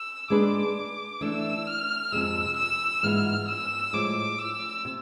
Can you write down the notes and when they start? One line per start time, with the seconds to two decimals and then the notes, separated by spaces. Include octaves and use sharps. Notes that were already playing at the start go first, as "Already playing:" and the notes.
Already playing: E6
0.30 G#3 D4 G#4 B4 D6
1.21 E3 A3 D4 E6
1.66 F6
2.12 F2 C3 G#3 E6
2.56 E6
3.03 G#2 E3 G#3 B3 F4 F6
3.48 E6
3.93 A2 F3 G#3 D6
4.38 E6
4.85 C3